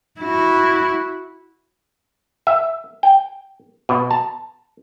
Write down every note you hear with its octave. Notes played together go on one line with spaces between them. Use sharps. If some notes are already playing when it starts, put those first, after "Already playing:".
E4 F#4
E5
G5
B2
A5